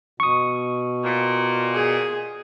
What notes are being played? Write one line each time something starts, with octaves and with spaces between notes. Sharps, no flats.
B2 C#6 D#6
A#2
G#4